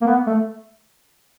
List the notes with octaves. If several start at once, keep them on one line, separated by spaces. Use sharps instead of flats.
A#3
B3
A3